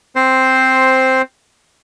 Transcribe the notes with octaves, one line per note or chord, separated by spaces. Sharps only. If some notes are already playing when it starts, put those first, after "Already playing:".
C4 C5